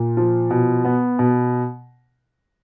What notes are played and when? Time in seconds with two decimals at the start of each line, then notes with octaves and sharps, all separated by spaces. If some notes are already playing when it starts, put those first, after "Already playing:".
Already playing: A#2
0.17 F3
0.51 B2
0.85 B3
1.19 B2